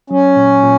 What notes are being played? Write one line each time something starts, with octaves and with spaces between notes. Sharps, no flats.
F#3 C#4
A#2
A#2